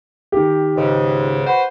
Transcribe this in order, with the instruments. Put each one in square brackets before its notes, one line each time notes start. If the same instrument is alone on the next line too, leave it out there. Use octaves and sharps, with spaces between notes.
[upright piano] D#3 G4
[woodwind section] C#2 G#2 C#3
F#4 B4 C5